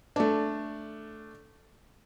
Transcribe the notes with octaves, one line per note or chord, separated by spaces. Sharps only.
A3 D4